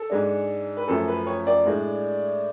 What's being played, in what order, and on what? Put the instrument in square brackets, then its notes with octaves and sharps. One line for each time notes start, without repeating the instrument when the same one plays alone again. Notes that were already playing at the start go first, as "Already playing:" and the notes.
Already playing: [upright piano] A4
G#2 G#3 D4
B4
F#2 F3 A3 C#4 A4
B4
C#5
D5
A2 G#3 D4